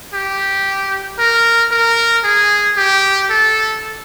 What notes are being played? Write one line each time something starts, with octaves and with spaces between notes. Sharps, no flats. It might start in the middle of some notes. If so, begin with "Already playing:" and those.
G4
A#4
A#4
G#4
G4
A4